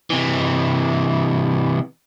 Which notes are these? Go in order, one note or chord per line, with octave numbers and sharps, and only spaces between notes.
C3 E3